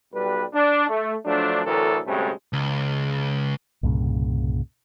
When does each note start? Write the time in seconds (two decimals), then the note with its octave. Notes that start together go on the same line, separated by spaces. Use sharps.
0.13 B1 G3 B4
0.54 D4
0.89 A3
1.25 F3 F#3 A3 D4
1.65 D2 A2 E3 F#3 A4 A#4
2.06 D2 G2 C3 G#3 A3 C#4
2.53 C#2
3.83 C2 G2 A#2 C#3